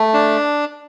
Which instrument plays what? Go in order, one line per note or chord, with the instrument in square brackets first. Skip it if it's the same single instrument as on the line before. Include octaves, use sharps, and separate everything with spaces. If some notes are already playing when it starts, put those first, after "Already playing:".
Already playing: [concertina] A3
D4